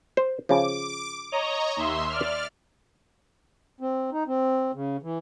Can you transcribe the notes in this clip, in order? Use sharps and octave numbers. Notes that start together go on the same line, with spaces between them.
C5
C#3 F3 D6
C#5 D#5 A#5
D#2 E5 C6
D5 F6
C4
D#4
C4
C#3
E3